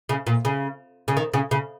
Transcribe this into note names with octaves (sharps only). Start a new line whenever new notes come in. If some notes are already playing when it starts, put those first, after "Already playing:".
C#3
A#2
C#3
C#3
D#3
C#3
C#3